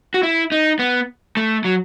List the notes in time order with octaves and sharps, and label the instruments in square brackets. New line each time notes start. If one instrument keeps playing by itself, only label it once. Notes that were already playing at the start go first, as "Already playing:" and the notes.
[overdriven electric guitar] F#4
E4
D#4
B3
A3
F#3